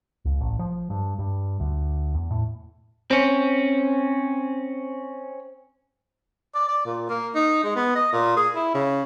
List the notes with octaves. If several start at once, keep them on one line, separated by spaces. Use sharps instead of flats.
C#2
A1
F3
G2
G2
D2
E2
A2
C4 C#4
D5
D5
A#2
A#3
D#4
G#3
B3
D#5
A#2
G#4
E4
C#3